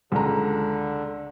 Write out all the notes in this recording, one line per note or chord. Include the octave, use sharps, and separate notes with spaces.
C#2 D3 A#5